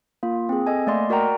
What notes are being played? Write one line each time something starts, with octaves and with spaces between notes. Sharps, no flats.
A#3 F4
C4 G#4
A4 D#5 G#5
A3 A#3 D5 D#5 C6
F#4 A#4 D5 F#5 G5 A#5